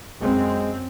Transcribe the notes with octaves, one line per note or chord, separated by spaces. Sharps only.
F#2 G#3 C4